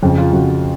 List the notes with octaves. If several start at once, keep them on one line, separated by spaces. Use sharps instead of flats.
F2 C#3
F4
F2 C#3 F#4